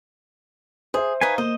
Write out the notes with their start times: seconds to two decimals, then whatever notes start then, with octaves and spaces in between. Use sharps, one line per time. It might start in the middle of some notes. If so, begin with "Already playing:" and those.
0.94 G#4 C5 E5
1.21 D#4 B4 C#5 F5 G#5
1.38 A#3 C5 D#5